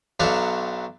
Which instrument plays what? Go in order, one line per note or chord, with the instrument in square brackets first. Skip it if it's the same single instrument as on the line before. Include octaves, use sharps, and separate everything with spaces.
[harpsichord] B1 F#3 D4 E5 F5 C#6